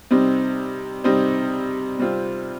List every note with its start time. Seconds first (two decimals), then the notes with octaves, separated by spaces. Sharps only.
0.11 C3 G3 C4 D#4
1.04 C3 G3 C4 D#4
1.99 C3 G3 C4 F4